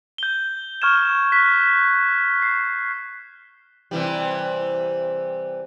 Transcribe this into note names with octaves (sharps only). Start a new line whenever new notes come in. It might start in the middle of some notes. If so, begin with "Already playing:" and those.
G6 G7
C#6 F6 G#6 E7
F#6 B6
C7
C3 E3 G3